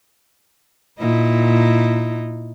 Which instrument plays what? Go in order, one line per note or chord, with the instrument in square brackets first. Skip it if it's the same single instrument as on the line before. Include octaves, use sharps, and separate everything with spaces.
[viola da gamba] A#2 D#4 E4